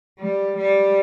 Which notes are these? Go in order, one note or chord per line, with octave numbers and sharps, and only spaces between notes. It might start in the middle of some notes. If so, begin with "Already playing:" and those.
G3
G3